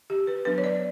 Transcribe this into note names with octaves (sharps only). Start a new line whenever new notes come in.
G4
B4
F#3 B3 D4 B4
C#5
D5